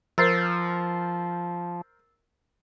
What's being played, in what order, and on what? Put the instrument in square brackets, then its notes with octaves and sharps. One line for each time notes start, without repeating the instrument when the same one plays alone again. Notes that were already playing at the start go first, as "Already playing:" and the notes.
[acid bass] F3 [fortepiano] A#4 C5 [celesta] E6 A6 C7